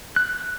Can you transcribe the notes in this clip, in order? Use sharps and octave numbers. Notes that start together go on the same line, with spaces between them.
F#6